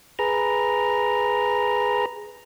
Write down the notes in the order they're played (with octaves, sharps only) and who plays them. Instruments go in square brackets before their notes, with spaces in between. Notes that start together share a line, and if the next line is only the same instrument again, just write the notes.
[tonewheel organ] G#4 B4 A#5